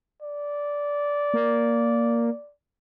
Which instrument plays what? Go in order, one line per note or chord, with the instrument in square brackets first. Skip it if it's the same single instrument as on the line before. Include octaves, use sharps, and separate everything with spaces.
[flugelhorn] D5
[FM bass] A#3